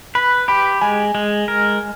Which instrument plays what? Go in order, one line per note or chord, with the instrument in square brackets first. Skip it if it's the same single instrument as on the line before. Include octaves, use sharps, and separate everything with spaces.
[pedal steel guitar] B4 [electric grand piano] B5
[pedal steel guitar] G4 [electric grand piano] B5
[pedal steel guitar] G#3 [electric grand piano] G#5
[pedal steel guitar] G#3
A#4